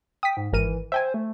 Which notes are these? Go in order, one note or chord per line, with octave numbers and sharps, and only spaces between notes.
G5 D#6 B6
G#2
G#1 E3 A#4 D#7
C5 E5 G5 G#5
A3